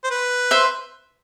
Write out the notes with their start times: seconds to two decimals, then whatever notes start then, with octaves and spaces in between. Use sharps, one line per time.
0.04 C5
0.10 B4
0.51 C5 E5